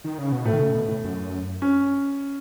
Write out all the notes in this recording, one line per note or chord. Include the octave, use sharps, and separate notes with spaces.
D#3
C#3
B2
A2 A3
D#3
C#3
B2
A2
F#2
C#4